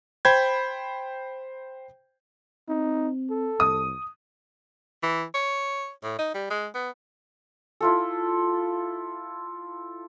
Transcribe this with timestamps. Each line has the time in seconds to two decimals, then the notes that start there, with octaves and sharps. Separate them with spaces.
0.25 C5 G5 B5 G6 G#6
2.69 C4 D#4
3.30 A4
3.60 C2 D#6
5.03 E3
5.34 C#5
6.03 A2
6.19 D#4
6.34 G3
6.50 G#3
6.75 B3
7.81 E4 F4 A4